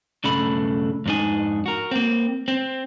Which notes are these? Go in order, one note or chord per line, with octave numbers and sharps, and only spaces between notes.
B1 G2 C#3 A3 D4 B5
F2 G#2 D4 D#4 G#5
F#4 A#4
A#3 C4
C4